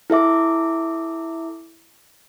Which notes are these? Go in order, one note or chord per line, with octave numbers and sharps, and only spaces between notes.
E4 A4 E5 D6